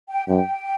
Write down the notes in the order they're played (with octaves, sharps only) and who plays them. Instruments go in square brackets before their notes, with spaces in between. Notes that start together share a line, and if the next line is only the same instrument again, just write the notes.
[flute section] G5
[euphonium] F#2 [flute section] G5